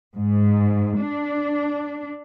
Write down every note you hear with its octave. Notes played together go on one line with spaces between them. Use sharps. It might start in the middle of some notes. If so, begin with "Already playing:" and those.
G#2
D4